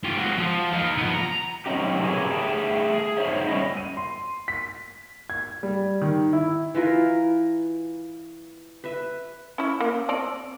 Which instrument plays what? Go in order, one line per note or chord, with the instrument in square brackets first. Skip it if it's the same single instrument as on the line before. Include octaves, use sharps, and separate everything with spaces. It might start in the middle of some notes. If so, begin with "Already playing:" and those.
[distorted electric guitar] F4 G4
G#3 F#4
F3
D#4 F5
F3 B3
A#5
[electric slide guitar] F#3 C4 C#4 D#4 G4
G4 G#4 A#4 B4 C#5 G#5
A3 G#4 G5 A5
G#4
D#4 C5 C#5 E5
G3 C#4 E4 D#5
[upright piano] D#7
C6
B6
G#6
G3
D#3
E4
[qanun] E3 E4 F4 A#4
B4 E5
[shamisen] C#4 E4
A#3
C4 D5 D#5